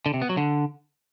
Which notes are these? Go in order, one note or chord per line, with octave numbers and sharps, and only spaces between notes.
D3
C3
B3
F#3
D3